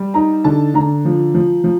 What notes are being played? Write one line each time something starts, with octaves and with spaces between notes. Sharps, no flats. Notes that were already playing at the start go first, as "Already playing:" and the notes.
Already playing: G3
D#4 A#5
D3 A5
D3 A#5
F3
F3
F3